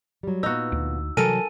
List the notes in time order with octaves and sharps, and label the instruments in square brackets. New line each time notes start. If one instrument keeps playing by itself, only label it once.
[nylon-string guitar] F#3 G3
[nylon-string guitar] A#2 B3 [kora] D#4 F#4 [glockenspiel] E6
[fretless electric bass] D2
[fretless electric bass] C3 E3 G3 [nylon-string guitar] F#3 [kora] A4 A#4 [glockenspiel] G#5 D#7